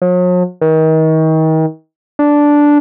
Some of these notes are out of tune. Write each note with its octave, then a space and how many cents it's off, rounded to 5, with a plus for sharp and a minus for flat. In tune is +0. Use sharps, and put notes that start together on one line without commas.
F#3 -45
D#3 +35
D4 -5